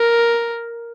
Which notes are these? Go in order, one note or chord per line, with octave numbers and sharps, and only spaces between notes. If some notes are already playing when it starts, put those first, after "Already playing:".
Already playing: A#4